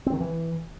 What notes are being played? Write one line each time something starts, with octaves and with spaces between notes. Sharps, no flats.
C4
D#3
E3